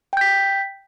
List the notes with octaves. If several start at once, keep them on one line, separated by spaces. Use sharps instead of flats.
G5 G6 B6